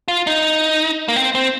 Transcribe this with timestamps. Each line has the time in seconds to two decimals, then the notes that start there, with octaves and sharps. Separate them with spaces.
0.08 F4
0.27 D#4
1.08 A#3
1.16 C4
1.35 C4